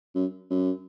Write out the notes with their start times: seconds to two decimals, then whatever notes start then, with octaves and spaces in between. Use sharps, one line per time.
0.15 F#2
0.50 F#2